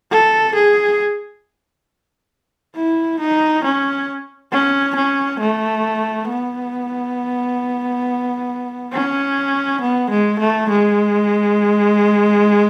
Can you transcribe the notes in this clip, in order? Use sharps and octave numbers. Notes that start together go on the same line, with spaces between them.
A4
G#4
E4
D#4
C#4
C#4
C#4
A3
B3
C#4
B3
G#3
A3
G#3